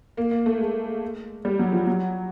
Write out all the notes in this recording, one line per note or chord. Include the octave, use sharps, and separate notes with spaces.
A#3
A#3
A3
G#3
G3
F#3
F3
F#3